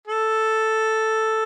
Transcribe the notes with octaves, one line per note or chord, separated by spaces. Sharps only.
A4